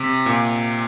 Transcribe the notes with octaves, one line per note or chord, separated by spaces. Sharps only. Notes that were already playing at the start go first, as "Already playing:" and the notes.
Already playing: C3
A#2